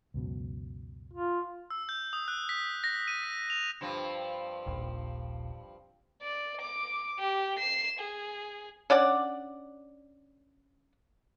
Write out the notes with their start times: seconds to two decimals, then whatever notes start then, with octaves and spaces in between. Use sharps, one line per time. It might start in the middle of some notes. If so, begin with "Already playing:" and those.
0.14 C#2 F#2 B2
1.13 F4
1.70 E6
1.89 G6
2.13 D#6
2.28 F#6
2.49 B6
2.84 A#6
3.08 D#7
3.23 B6
3.50 F7
3.81 G2 F3 C4
4.66 D#1 A#1
6.22 D5
6.61 D6
7.19 G4
7.59 C7 E7
7.99 G#4
8.90 C#4 D4 D5 F#5